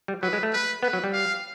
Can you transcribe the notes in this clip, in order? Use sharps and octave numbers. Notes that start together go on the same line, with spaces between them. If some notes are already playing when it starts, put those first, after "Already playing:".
G3
F#3 B4
G#3
A3
B4
B3 B4
F#3
G3
F5